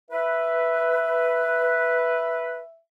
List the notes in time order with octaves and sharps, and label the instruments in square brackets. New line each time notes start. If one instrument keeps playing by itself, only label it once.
[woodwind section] B4 [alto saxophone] E5